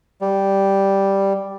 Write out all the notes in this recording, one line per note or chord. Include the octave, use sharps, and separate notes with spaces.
G3